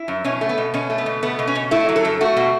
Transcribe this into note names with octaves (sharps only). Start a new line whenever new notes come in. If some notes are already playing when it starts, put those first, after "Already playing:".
Already playing: E4
F#2
B2 C#4
A3
B3
B2
B2 C#4
A3
B3
B2
A3 B3
B2
C#4
B2
A3 E4
F#3
A4
F#2
A3 F#4
B2